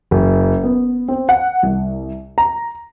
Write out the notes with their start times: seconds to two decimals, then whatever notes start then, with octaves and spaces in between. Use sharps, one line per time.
0.11 F#1
0.64 B3
1.08 C4
1.29 F#5
1.63 C2
2.38 A#5